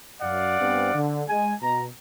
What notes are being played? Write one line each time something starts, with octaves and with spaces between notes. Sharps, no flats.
F#2 D5 F5 F#5
G2 B3 C4
D3
G#3 G#5
B2 A#5